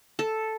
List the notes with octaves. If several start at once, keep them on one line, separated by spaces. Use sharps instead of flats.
A4